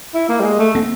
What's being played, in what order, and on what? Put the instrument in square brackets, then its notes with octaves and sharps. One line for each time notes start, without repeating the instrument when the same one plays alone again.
[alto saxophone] E4
A#3
G3
G#3
A3
[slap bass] A#3 C4